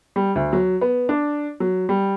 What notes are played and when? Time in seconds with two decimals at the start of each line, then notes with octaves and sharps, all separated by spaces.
0.16 G3
0.36 D2
0.53 F#3
0.81 B3
1.09 D4
1.60 F#3
1.89 G3